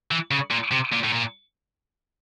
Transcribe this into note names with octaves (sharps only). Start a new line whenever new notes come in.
E3
C#3
A#2
C3
A#2
A2
A#2